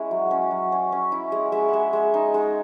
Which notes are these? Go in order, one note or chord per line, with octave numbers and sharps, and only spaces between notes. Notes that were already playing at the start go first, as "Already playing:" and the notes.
Already playing: G#3 C#4 E4 E5
F#3
C#4
F#3
C#4
C#4
E4
G#3
G#3 E5
G#3 E5 F#5
G#3
D#4
G#3